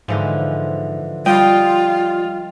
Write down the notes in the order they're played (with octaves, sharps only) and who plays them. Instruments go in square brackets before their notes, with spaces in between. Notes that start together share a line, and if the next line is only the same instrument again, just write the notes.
[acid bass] G#2 [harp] D3 E3 F3
[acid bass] G3 [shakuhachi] F4 [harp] D#5 G5 D#6